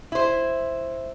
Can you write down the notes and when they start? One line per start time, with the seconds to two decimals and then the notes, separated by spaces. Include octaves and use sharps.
0.12 E4 C5